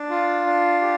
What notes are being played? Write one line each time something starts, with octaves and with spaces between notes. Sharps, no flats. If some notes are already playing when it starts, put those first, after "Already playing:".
Already playing: D4
F4
D4
G4